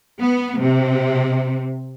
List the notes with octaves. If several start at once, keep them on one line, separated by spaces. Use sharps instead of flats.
B3
C3